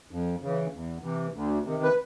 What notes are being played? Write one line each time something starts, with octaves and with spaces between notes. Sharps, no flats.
F2
C#3 E3
E2
C3 E3
D2
C3 D#3
B4